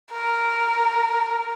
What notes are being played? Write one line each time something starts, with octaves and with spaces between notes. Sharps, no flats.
A#4